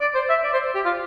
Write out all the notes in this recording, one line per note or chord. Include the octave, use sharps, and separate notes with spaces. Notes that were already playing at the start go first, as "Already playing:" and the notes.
D5
C5
E5
D5
C5
G4
F4